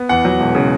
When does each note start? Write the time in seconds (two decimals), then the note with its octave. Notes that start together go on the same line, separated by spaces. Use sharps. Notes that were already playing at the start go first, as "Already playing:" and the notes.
Already playing: B3
0.09 E2 F#5
0.25 F#3
0.40 E1
0.55 C#3